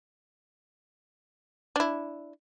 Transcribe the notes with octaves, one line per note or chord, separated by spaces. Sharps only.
D4 E4